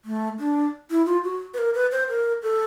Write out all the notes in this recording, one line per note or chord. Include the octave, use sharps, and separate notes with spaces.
A3
D4
E4
F4
F#4
B4
A#4
B4
C5
A#4
A4